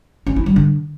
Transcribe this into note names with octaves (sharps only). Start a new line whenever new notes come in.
C#4
E4
G3
D3